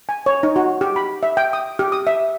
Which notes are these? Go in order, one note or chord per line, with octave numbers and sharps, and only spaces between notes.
G#5
C#5
D#4
F#4
G4
B5
E5
G5
D#6
G4
D#6
E5